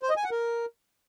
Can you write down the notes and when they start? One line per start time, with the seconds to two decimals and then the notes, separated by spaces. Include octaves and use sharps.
0.03 C5
0.10 D#5
0.17 G#5
0.24 F#5
0.31 A#4